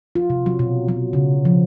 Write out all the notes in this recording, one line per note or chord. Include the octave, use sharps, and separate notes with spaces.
F4
C3
F#3
B2
F#3
C#3
F3